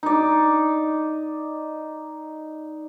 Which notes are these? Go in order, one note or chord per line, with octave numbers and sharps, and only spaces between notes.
D#4 D5